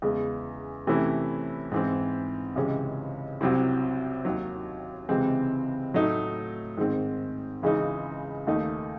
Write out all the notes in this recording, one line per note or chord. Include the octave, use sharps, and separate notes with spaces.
E2 C#3 G#3
C3 E3 A3 C#4 E4
G#2 E3 C4
C#2 C3 E3 G#3 C#4
C2 C3 F#3 C4 E4
D#2 D#3 F#3
C#2 C3 E3 G#3 C4
A2 F#3 A3 D#4
G#2 D#3 G#3 C4
C#2 C#3 E3 G#3 D#4
D#2 D#3 A3 D#4